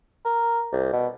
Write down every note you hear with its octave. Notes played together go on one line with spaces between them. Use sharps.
A#4
C2
B2